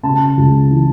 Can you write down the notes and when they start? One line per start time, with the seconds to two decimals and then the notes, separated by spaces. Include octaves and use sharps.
0.03 C#3 A5
0.37 C#2
0.71 E3